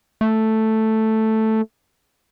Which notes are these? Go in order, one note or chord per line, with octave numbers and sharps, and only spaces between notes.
A3